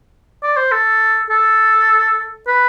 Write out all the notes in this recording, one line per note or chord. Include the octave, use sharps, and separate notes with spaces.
D5
C5
A4
A4
B4